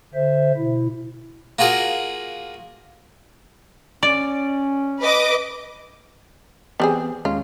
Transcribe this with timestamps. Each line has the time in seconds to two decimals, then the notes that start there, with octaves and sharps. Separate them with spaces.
0.14 D3 C5 E5
0.57 B2 E4
1.59 A#3 F4 F#4 G#4 A#4
4.03 C#4 D5
5.00 B4 D#5 D6
6.80 E3 G3 B3 C4 G#4 G5
7.25 D#2 G#3 C#4 F4